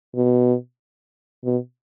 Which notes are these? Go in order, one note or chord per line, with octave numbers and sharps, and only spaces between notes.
B2
B2